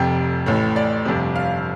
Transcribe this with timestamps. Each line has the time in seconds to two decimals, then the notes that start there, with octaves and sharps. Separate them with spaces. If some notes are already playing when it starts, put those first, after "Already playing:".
Already playing: F1 F2 C3 G5
0.46 A1 A2
0.76 D5
1.05 G1 F2 C3
1.36 F5